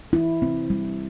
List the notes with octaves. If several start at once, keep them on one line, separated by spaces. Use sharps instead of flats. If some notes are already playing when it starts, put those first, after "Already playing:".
E4
C4
G3